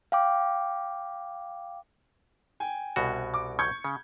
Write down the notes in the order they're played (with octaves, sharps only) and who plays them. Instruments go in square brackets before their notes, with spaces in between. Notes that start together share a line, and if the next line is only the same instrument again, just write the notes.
[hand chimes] F5 G5 D6
[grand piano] G5 G#5
[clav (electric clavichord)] C2 B2 F#4
[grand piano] D6
C#6 G6 G#6
[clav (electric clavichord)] C#3